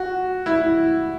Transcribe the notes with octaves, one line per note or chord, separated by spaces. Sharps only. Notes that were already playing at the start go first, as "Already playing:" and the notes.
Already playing: F#4
E4